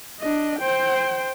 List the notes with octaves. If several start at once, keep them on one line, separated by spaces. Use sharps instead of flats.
D4 D#5
C5 G5